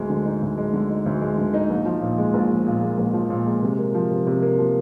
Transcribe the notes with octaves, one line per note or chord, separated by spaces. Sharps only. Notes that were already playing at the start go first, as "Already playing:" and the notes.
Already playing: D2 G#3
D3
D#4
D2
G#3
D3
D#4
D2
G#3
D3
D#4
A#1
F3
A#2
G#3
A#1
F3
A#2
G#3
A#1
F3
A#2
G#3
C3
A#3
F3
C3
C3
A#3
F3